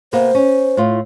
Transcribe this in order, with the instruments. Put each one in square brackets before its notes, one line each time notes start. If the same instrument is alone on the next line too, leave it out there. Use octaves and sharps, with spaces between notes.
[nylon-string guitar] C3 A#3 B3 [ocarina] C5
[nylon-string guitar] C#4
A2 F4